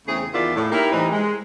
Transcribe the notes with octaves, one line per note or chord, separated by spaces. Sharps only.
E2 C#3 A3 C4 G#4
E2 D#3 F4 F#4 D5 E5
A2
A#3 D#4 E4 G4 A#4
A2 E3 G3 C4 D#4
G#3